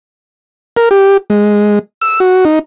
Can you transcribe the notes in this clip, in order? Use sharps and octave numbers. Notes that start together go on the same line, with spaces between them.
A#4
G4
G#3
E6
F#4
D#4